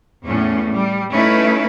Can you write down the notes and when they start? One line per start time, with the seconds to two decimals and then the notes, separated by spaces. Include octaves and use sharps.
0.25 E2 A2 C#4
0.72 G3
1.11 A3 C#4 D#4 E4 B4